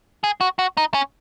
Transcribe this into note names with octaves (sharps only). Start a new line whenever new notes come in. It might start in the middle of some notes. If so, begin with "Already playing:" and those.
G#4
F#4
F#4
D#4
C#4